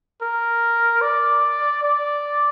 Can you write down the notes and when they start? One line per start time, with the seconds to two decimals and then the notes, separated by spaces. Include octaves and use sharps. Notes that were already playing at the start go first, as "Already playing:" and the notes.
0.22 A#4
1.01 D5
1.83 D5